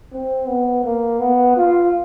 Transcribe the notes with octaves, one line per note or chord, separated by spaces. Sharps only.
C4
B3
A#3
B3
F4